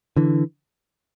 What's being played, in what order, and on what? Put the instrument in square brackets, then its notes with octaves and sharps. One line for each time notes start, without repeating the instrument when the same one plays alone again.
[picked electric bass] D3 E3